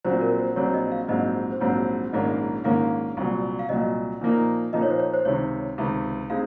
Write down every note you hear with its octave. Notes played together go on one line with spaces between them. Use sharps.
A#1 A#2 F#3 C4 C5
A#4
C5
A#1 A#2 F#3 C4 C#5
D#5
F5
A#1 G#2 F#3 C4 D#5
C5
A#1 G#2 F#3 C4 C#5
A#1 G#2 D#3 A#3 C#4 D#5
A#1 G#2 D#3 A#3 C#4 F5
C2 A#2 F#3
F5
C2 A#2 F#3 D#5
A#2 F3 A#3 D#4
A#2 F3 A#3 D#4 D#5
C#5
C5
C#5
C5
C#2 C3 D#3 C#5
C#2 C3 D#3
G#3 C4 D#4 F5